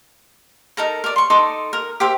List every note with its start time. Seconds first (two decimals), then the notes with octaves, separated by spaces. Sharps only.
0.77 D#4 A4 A#4 A#5
1.04 A#4 D5
1.16 C6 C#6
1.30 D#4 A4 C6 D6
1.73 A#4
2.00 G4 A#4 C5 E5